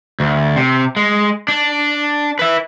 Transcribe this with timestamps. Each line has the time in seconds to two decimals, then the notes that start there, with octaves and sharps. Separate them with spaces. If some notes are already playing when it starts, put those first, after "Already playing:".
0.20 D2
0.56 C3
0.97 G#3
1.48 D4
2.39 B4 E5